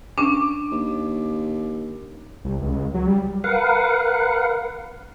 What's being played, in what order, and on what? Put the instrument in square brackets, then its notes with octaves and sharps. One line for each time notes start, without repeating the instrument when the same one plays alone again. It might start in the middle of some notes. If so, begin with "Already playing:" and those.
[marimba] C#4 D4 [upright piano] D6
[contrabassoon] D#2
[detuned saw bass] C2
C#2
F#3
G3
[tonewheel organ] A#4 B4 F5 F#5